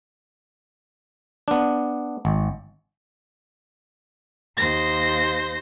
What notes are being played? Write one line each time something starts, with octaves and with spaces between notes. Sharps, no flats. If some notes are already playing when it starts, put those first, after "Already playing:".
B3 D4
G#1
D#2 C5 A#6